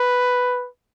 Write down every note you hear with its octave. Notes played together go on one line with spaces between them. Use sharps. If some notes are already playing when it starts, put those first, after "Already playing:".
Already playing: B4